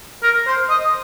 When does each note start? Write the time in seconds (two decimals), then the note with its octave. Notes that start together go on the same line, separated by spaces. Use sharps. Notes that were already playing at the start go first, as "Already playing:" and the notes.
0.23 A#4
0.47 C5
0.70 D#5